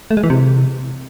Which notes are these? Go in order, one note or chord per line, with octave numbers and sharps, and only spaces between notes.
A3
G#3
E3
C3